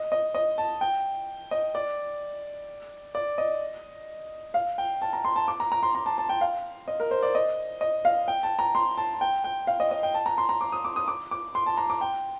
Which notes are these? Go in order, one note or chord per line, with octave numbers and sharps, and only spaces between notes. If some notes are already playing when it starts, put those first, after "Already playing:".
Already playing: D#5
D#5
D#5
A5
G5
D#5
D5
D5
D#5
F5
G5
A5
A#5
C6
A5
D6
A#5
A#5
C6
A#5
A5
A5
G5
F5
D#5
A#4
C5
D5
D#5
D#5
F5
G5
A5
A#5
C6
A5
G5
G5
F5
D#5
D#5
G5
A5
A#5
C6
A#5
D6
D#6
D6
D#6
D6
D6
C6
A5
A#5
D6
G5